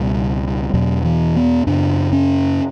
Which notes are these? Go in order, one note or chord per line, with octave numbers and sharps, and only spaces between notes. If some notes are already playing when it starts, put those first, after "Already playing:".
Already playing: C#2 B2 G3
E2 B2 F#3
E3
B3
F#2 C#3 D4
C#4